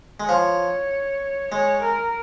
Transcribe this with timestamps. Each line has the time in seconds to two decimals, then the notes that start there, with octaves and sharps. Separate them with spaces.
0.20 G#3
0.28 F3 C#5
1.51 G#3 C#5
1.82 A#4